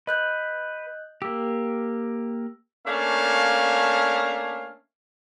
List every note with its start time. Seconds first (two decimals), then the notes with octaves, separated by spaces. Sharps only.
0.07 B4 D#5 F#6 G6
1.22 A#3 G4 E6
2.86 A3 A#3 C#4 D4 C#5 F5